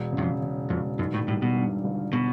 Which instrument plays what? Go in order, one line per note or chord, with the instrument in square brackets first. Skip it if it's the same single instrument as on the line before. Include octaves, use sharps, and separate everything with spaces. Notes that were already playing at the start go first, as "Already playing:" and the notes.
Already playing: [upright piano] E1
C#3
[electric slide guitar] E2
F2
[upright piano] C#3
[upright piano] E1 [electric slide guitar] F2
[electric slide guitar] F#2 [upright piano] D#3
[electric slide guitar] A2
[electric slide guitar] A2 [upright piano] G3
[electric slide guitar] B2
[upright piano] G2
G1
[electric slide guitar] B2